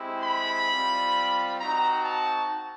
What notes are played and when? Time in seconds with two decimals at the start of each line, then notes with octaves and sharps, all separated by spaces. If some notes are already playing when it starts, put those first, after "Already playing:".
Already playing: G#3 C4 E4 G4
0.23 B5
0.69 G3 C4 F4
1.59 C4 D#4 F#4 A#5
2.04 A5